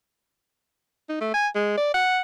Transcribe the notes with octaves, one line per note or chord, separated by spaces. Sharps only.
D#4
A3
G#5
G#3
D5
F#5